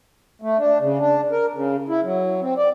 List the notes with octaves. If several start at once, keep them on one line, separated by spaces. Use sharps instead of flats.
A3
D4
C#3
D4
A#4
C#3
E4
F#3
C4
D5